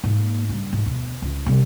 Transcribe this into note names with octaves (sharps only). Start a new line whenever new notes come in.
G#2 A#3
G2 C#3
G#2
D2 B2
C#2
C3 G3